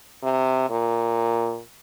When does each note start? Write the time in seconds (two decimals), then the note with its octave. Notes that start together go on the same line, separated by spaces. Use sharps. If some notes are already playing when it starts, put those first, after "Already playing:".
0.23 C3
0.70 A#2